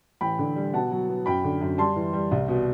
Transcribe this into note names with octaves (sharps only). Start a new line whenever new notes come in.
A1 G5 B5
D3
G3
B2 F#5 A5
F#3
B3
F#2 G5 B5
D3
F#2
G3 A5 C6
E3
G3
C2
B2